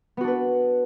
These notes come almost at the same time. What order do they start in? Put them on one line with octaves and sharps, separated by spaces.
B3 F#4 D4 B4